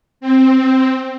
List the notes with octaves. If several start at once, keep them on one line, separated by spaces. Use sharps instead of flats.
C4